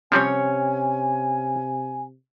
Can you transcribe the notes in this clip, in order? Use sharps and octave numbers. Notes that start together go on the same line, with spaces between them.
C3 F3 G3 C4 C#4 C#5 G#5